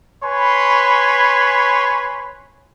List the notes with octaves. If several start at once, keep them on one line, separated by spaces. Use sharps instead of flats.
B4 C#5 G#5 B5 C6